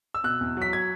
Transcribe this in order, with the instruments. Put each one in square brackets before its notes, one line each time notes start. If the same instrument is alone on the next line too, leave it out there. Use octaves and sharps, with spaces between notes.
[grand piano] E6
B2 F#6
E2
F#3 B6
G#6